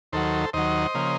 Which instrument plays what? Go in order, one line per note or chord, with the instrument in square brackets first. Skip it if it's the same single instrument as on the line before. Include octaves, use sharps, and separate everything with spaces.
[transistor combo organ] D#2 D#3 F#3 A4 C5
D#2 D#3 F#3 C5 D#5
C#3 F3 A#3